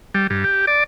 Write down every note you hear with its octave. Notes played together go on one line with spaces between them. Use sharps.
G3
G2
G4
D5